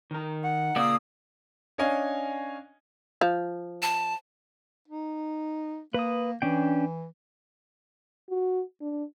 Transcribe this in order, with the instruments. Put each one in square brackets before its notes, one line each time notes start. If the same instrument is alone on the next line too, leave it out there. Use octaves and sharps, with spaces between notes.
[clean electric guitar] D#3 A#4
[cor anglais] F#5
[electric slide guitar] A#2 A#3 D5 [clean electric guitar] C#3 [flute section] F5 D#6 E6
[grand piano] C#4 D4 C#5 D#5 F5 G#5
[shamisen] F3
[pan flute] A5
[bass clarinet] D#4
[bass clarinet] A#3 [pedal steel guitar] B4 D#6
[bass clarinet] E3 [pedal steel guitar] C#4 D4 G5
[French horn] F#4
D4